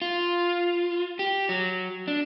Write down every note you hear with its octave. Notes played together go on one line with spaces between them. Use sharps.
F4
G4
F#3
D4